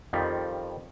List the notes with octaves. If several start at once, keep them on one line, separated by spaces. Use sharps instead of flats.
F2 D#3 F3 G3